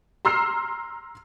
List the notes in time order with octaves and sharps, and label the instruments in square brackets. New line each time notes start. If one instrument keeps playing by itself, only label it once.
[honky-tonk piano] A#5 C6 E6 F6 C7